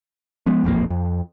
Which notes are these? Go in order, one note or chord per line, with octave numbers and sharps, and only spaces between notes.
F3 G#3 B3
E1 A#1 F2 A#3
F2